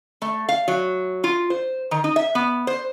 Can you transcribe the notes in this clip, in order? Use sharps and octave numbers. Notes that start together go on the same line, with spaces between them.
A3
F5
F#3
F4
C5
D#3
D#4
E5
B3
C5